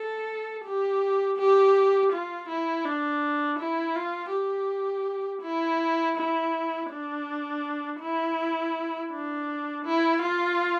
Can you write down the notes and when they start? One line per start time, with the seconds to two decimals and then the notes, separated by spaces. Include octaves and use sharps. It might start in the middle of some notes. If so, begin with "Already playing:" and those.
Already playing: A4
0.64 G4
1.37 G4
2.12 F4
2.49 E4
2.85 D4
3.59 E4
3.96 F4
4.32 G4
5.42 E4
6.16 E4
6.91 D4
8.00 E4
9.12 D4
9.85 E4
10.22 F4